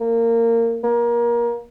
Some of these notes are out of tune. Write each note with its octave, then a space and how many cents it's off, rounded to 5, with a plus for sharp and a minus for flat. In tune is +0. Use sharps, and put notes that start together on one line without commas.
A#3 -20
A#3 +25